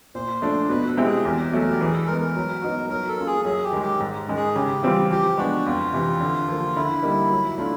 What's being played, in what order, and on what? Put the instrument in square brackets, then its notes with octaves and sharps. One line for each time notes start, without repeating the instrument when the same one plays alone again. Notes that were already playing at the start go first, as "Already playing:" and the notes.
[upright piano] A#2 [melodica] C5
[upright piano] F3 A3 D4
[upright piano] B2 [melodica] B4
[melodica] A4
[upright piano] G#3 C4 E4 G4
[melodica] G#4
[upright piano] E2 [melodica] A#4
[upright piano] B2 F#3 A3
[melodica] G4
[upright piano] E3 [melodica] G#4
[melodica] A4
[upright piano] G#3 B3 [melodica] A#4
[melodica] A#4
[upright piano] F#3
B3 D#4 F#4
[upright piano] F#3 [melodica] A#4
[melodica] A4
[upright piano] A#3 C#4 F4
[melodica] G#4
[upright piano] F#2 [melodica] G#4
[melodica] G4
[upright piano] D#3 G#3
[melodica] G4
[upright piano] G#2
D#3 G#3 C#4
[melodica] G#4
[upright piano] C#3 [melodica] G4
[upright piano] E3 G3 C4 F4
[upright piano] F3 [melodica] G4
[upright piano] G#3 B3 D4 [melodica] F#4
[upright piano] F2 [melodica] F4
[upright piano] C3 E3
D3
F3 A#3
[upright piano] D3 [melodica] E4
[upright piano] G3 A#3 D#4
F#3
A3 D4 F4